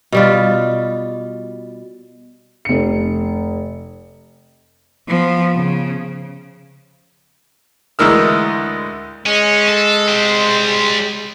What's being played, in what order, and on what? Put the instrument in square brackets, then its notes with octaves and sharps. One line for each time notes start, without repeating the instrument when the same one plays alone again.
[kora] B2 G3 F4
[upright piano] F1 C#7
[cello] F3 B3
C#3
[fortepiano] D2 E3 G#3 A#4 E6
[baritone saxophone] G#3 [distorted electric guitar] C#4
[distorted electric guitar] A4
G3 C5